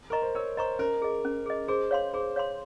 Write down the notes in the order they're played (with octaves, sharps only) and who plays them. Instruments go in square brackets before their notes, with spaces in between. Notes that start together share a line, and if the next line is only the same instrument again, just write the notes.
[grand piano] A#4 [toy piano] D#5 A#5 C#6
[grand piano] C5
[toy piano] A#4 [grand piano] C#5
[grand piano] C5 [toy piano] D#5 A#5 C#6
[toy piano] C#4 [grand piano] A#4
[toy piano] G#4 D#5
C#4
G#4 D#5
[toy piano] G#4 [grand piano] C5
[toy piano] C#5 F5 C6
[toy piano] G#4 [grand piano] C5
[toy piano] C#5 F5 C6